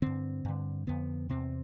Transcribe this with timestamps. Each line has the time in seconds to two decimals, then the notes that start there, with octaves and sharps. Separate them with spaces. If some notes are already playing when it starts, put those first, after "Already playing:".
0.02 G2 D3 C4
0.45 G2 D3
0.87 F2 D3 B3
1.30 E2 C3 C4